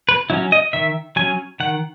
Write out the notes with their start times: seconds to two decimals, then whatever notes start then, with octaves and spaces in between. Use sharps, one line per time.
0.09 B4
0.30 F#3 C#4 E4
0.52 D#5
0.73 D#3 E5
1.16 F#3 C#4 G#5
1.60 D#3 F#5